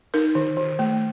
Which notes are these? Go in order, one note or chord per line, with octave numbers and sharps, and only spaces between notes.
D#4 A#4
D#3
D#3
A3